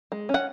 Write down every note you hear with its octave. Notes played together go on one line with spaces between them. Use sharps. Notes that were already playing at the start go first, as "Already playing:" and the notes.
G#3
C#4
F#5